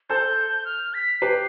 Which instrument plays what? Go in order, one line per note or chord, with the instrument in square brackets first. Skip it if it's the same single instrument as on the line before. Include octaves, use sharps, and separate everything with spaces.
[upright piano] A4 C5 [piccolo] G6
[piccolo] F6
B6
[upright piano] G4 B4 [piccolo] C7